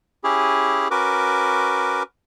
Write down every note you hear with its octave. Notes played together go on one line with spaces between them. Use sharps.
C#4 E4 G4 G#4
C#4 F#4 A#4 B4 D6